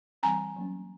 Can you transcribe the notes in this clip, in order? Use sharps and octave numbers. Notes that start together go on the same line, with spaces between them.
E3 G3 C4 G#5 A#5
F#3 A#3 C#4